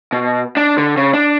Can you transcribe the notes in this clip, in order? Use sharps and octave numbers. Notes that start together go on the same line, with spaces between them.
B2
D4
D3
C#3
D4